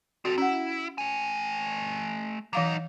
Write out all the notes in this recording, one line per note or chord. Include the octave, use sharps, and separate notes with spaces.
C4 F#4 A4
C#4 E4 F#5
A3 G#5
E3 F#3 D#4 F5 D6